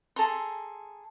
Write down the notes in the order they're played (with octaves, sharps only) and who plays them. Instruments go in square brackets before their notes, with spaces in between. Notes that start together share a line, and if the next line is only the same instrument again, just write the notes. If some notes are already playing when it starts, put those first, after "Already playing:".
[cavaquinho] G#4 A4 A#5 C6